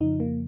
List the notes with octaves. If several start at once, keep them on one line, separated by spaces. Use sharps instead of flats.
F2 C#3 F3 D#4
A#3